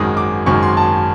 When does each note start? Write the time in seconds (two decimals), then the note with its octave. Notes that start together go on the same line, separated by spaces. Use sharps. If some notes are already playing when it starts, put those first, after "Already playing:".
Already playing: G#1 F#2 D#3 G#3 D#6
0.17 D6
0.46 G#1 F#2 D#3 G#3 C#6
0.63 C6
0.77 A5